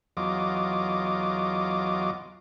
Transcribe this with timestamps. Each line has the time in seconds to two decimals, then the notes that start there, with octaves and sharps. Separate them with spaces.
0.17 E2 F#3 F4 D#5 D6